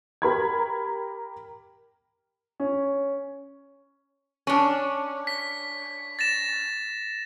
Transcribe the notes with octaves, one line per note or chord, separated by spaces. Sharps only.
G4 A#4 B5 G#6
C#4
C#4 D4
B6
A6 A#6 E7